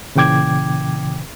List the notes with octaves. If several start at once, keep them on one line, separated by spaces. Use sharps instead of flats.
A#2 C#3 E3 G5 D6 G#6